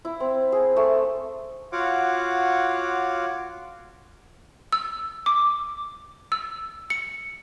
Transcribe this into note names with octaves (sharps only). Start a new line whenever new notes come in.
E4
C4
G#4
A3
F4 F#4 C#5 F5 F#5 D6
E6
D6
E6
C#7